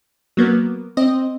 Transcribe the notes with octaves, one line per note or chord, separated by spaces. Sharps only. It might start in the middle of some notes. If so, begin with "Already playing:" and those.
F#3 A#3 B3
C4 D#5